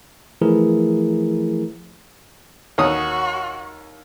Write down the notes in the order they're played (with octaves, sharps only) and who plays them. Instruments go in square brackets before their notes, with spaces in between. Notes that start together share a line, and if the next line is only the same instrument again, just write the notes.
[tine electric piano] E3 F3 A3 E4 G#4 A#4
[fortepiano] D#2 C#5 D#6 [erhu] F#4